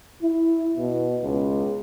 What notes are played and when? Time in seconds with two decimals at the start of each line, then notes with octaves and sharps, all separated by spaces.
0.22 E4
0.77 B2
1.23 C#2